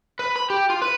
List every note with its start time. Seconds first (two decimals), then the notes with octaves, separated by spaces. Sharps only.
0.19 B4
0.36 B5
0.50 G4
0.70 F4
0.82 B4